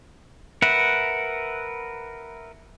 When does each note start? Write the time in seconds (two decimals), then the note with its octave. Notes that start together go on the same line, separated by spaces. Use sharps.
0.62 A#4 B4 E5 F#5